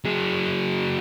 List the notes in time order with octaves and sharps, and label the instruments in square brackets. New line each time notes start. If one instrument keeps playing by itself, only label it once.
[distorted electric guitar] F#3 G#4